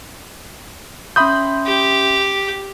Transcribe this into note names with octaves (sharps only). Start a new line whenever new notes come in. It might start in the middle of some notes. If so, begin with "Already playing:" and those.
C#4 E5 B5 C6 D#6 G6
G4